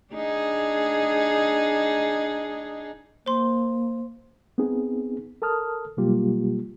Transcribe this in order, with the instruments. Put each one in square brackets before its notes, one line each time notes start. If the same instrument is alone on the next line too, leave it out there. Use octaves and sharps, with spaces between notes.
[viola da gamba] D4 D#4 G#4
[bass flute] A#3 [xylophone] C5 C6
[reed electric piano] B3 C4 D#4 G#4
A4 A#4 A5 D#6 F6
B2 F#3 G3 A#3 F4 G4